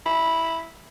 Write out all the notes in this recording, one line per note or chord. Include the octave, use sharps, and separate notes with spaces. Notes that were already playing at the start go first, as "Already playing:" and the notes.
E4